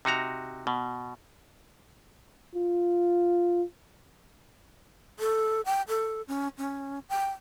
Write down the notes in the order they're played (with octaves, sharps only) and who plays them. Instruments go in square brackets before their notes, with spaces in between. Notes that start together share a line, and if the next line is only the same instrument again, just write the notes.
[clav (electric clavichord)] C3 D#4 F#4 A#5
B2
[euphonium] F4
[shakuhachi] A4
G5
A4
C#4
C#4
G5